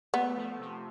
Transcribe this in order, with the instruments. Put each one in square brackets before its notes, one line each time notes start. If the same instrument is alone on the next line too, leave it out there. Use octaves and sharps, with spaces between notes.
[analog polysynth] A3 [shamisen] B3
[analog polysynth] F3
C3